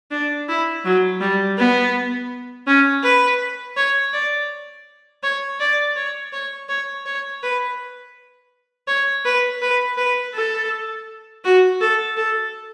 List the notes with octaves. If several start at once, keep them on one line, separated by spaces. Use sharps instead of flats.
D4
E4
F#3
G3
B3
C#4
B4
C#5
D5
C#5
D5
C#5
C#5
C#5
C#5
B4
C#5
B4
B4
B4
A4
F#4
A4
A4